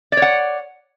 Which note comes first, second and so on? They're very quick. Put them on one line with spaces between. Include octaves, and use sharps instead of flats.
D5 C#5 F#5